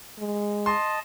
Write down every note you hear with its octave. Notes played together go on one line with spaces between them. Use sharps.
G#3
D#5 A5 C6